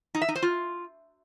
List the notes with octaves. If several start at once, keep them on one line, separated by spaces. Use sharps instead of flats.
D#4
E5
D#4
C5
F4